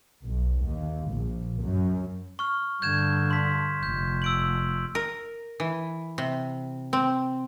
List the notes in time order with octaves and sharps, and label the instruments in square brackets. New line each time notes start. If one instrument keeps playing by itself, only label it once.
[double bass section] B1
D#2
A#1
F#2
[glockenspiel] C#6 F6
[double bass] G2 D3 [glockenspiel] G6 G#6 E7
[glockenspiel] C6 B6
[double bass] F1 [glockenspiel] G6
[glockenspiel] E6 D7 F#7
[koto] A#4
E3
C3
C4